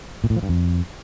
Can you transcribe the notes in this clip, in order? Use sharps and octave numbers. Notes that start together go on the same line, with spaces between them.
A#2
A2
F3
G2
F2